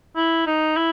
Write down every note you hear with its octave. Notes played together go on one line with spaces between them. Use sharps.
E4
D#4
E4